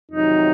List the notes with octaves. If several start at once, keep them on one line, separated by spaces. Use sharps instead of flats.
F2 C3 D#3 F#3 D#4